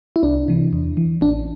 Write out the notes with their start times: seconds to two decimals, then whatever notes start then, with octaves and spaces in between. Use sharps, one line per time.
0.16 E4
0.23 C2 D4
0.48 C3 E3
0.73 E2
0.97 E3
1.21 A1 D4